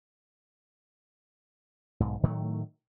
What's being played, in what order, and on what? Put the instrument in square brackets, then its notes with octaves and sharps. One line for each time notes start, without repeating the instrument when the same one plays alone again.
[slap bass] B1 G#2
A2 D#3 F#3 A3